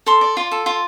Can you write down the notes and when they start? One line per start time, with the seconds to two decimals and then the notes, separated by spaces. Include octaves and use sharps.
0.06 A4 C6
0.21 D5
0.37 F4
0.51 A4
0.66 F4